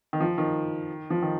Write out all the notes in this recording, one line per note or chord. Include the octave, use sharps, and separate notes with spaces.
D#3
F3
D#3
F3
D#3